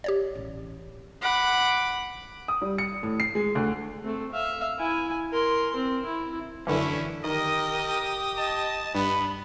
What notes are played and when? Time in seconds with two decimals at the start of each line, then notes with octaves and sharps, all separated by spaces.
0.04 G4 C#5 D5
0.35 A1
1.21 F#5 B5 D6
2.48 D#6
2.62 G3
2.78 C#7
3.03 A2
3.20 C7
3.35 G#3
3.55 D2
4.03 A3 C4
4.33 E5 F5
4.78 E4 G#5
5.33 A#4 C6
5.76 C4
6.06 E4
6.67 F#2 D3 E3 A3 C#4 D4 E4
7.24 D#3 G4 A#4 D#5 D#6
8.37 D#5 A5
8.95 G2 B3 B5